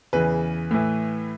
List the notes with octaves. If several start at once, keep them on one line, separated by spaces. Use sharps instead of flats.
E2 C#3 E3 B4
A2 E3